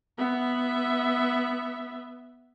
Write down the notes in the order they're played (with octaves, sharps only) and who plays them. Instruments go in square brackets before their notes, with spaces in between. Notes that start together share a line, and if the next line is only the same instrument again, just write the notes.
[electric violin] B3 E5